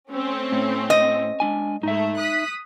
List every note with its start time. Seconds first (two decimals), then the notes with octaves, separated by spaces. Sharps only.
0.11 A3 C4 C#4
0.52 A2
0.90 D#5
1.40 G#3 D4 G#5
1.83 G#2 A3 D#4 E5
2.20 D#6 F#6 B6